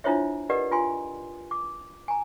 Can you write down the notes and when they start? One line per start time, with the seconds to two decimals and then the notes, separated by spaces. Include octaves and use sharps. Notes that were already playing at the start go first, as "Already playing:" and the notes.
0.04 D4 E4 F4 C5 C#5 E5
0.50 G4 A#4 B4 D5 D#5 F#5
0.71 F4 G#5 C6
1.51 D6
2.08 G#5 A#5